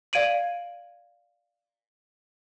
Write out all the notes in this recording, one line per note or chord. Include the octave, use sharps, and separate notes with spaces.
D5 F5 G#6 D7 D#7 F#7